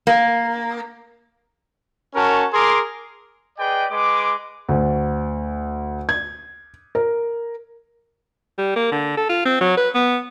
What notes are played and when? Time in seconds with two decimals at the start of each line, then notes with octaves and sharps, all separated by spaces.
0.07 A#3
2.15 C#4 F#4 A#4 A5
2.54 G#4 A#4 C6 D6
3.59 G#4 B4 D5 D#5 G5
3.90 G#3 B4 D6
4.69 D2
6.09 G#6
6.95 A#4
8.58 G3
8.76 A#3
8.92 D3
9.17 A4
9.29 F4
9.45 C4
9.60 F#3
9.77 B4
9.95 B3